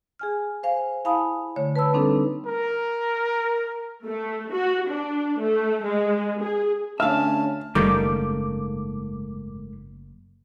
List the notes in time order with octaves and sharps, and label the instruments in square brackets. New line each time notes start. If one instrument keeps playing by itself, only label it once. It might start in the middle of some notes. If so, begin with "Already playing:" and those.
[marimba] G#4 G#5 F6
C5 F5 G#5
E4 F5 G#5 A5 B5 D#6
D3 A3 C#5
B4 A5 B5 E6
G3 A#3 C4 D4 D#4 A4
[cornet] A#4
[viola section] A3
F#4
D4
A3
G#3
G#4
[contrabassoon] D2 [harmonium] C#4 A5 [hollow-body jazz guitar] E5 F5 [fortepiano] F6
[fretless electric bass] F#1 [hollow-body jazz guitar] G#2 A3 A#3 [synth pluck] D#3 G3 [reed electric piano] D6